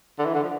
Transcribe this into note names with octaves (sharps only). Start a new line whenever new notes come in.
D3
E3
D3
F3